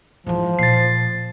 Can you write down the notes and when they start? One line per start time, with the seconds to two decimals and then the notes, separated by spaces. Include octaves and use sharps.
0.26 G#2 E3 F3
0.59 A#2 A6 C7